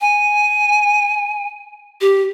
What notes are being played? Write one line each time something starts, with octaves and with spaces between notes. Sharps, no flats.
G#5
G4